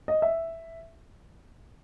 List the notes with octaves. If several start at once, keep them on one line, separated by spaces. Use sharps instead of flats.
D#5
E5